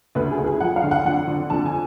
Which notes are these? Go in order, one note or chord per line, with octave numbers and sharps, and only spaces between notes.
D2 B4
G#4
D2
G#4
F3 F#5
F5
D3
F#5
F2 F#5
D3
F2 A5
G#5